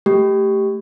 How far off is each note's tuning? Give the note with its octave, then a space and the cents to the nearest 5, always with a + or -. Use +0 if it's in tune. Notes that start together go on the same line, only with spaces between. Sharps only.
A3 +0 G4 +0